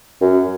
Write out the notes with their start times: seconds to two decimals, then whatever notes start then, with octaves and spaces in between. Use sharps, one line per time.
0.21 F#2